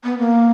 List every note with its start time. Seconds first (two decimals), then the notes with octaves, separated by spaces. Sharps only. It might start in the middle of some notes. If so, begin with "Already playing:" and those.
0.04 B3
0.19 A#3